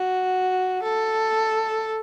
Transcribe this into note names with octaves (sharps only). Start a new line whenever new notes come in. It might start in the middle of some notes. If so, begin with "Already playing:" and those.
Already playing: F#4
A4